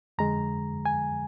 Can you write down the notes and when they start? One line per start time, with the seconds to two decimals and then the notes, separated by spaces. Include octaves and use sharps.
0.18 F2 D3 G#3 A#5
0.86 G#5